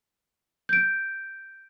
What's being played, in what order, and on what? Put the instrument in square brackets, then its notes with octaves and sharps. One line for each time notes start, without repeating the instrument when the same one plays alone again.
[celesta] G6 D7